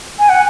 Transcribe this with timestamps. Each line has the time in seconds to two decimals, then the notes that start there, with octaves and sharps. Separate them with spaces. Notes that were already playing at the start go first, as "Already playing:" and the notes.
0.19 G#5
0.29 F#5